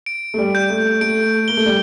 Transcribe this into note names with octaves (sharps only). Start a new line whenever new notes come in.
D7
A3
G3
G6
A3
A3 D7
A#3 G7
A3
G3